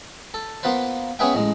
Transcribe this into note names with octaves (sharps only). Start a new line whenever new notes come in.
A4
A#3 B3 F4 B4 C5
B3 C#4 G#4 B4 E5 G5
A1 G#3